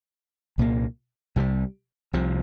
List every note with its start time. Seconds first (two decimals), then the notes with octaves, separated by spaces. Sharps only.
0.58 C2 A#2 F3 A#3
1.36 C2 C3 D#3 G3
2.13 C2 C3 F3